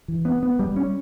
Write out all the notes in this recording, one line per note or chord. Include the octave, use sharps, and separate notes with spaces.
E3
B3
B3
G3
C#4